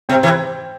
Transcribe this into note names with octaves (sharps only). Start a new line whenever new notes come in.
C3 C4
C3 E3